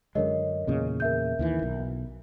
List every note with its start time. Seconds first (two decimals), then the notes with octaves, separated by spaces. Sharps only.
0.15 F#2 D3 G#3 A#4 C#5 D#5
0.67 E2 A#2 C#3
1.00 A#4 E5 G6
1.39 D#2 D#3 E3
1.63 B1